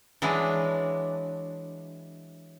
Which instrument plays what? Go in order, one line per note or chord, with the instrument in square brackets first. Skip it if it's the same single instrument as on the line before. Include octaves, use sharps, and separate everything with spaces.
[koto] E3 F#3 G#3 D4